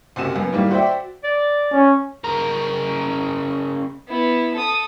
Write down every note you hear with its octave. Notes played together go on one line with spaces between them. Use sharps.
F#1 C3 F#4 E7
F#2 B3
A2 D#3 G3 A3 A#3
F#4 C5 D5 E5 G5
D5
C#4
C#3 A#4
B3 E4
A4 D#6